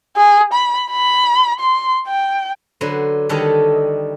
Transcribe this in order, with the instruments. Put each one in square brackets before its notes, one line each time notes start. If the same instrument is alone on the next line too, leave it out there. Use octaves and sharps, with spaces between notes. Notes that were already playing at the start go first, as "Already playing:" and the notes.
[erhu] G#4
B5
B5
C6
G5
[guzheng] D3 F#3 B4 C5
D3 D#3 G3 A4 C#5 D#5